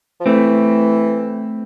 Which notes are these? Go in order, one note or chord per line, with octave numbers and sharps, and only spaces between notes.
F3
E3 A3 C4